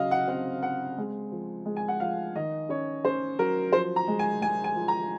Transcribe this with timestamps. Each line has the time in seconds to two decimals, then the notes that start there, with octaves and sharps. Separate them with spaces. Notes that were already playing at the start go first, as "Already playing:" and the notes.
Already playing: C#3 F#3 D#5 F5
0.11 F#5
0.28 C4 F#5
0.62 C4 F#5
0.98 G#3
1.32 F3
1.66 G#3
1.77 G#5
1.88 F#5
2.00 F3 F5
2.36 D#3 D#5
2.69 C#4 C#5
3.05 C#4 C5
3.39 F#3 A#4
3.73 F3 C5
3.96 A#5
4.08 G#3
4.19 G#5
4.41 G#3 G#5
4.64 G#5
4.76 F3
4.88 A#5